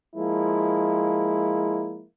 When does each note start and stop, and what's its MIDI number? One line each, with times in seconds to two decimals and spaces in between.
0.16 2.05 53
0.16 2.05 56
0.16 2.05 58
0.16 2.05 64